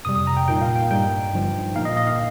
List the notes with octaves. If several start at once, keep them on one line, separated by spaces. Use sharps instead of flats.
F2 C3 G3 D#6
D#6
A#5
G5
A#2 A#3 D#4 G5
F5
G5
G2 G3 D#4 G5
G1 G2 F3
A#2 A#3 D#4 F5
D#5
D#5
F5